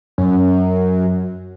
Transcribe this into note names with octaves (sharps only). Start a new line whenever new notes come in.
F#2